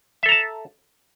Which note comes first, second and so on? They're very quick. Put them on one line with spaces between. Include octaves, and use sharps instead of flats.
E5 A4 A#5 A5